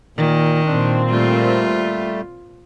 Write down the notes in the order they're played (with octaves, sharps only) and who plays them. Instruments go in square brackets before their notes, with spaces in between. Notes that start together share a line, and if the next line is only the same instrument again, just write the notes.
[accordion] A#2 [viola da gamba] D#3
[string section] A#2 C4 [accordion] D4
[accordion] G3 A3 [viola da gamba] F4